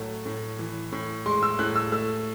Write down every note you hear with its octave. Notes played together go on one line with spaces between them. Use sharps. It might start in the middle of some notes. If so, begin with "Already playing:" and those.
Already playing: A2 F#3 A3
A2
E3
A2
G#3 C6
E6
A2 F#6
E6
A3 E6